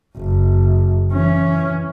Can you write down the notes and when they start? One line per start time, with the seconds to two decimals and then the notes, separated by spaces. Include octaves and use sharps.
0.17 F#1
1.12 E3 C#4